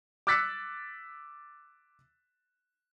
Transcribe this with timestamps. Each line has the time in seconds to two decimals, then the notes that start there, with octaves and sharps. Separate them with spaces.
0.27 D6 E6 F#6 A6 B6 C#7